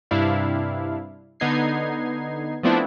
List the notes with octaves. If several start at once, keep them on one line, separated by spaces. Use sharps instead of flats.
G2 C3 D4 E4 F5
D3 B3 D#4 G#6 C7
F3 A3 B3 C4 D4 E4